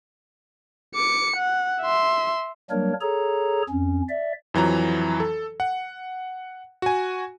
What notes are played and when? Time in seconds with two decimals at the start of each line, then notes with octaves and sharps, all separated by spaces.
0.95 D6 C#7
1.36 F#5
1.81 E5 C6
2.71 F#3 G3 A#3 D4 A#4 C#5
3.01 G#4 A4 C#5 A#5
3.69 F2 C#4
4.09 D5 E5
4.54 F2 E3 F#3 A#5
5.20 A4
5.60 F#5
6.82 F#4 G#5